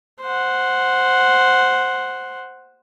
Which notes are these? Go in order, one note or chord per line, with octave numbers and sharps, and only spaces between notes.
C5 F#5